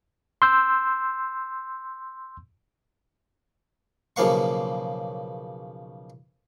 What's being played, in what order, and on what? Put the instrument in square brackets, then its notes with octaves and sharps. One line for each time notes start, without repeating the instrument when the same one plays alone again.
[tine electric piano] C6 E6 G6
[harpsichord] B1 C#3 F3 A#3 F5 C#6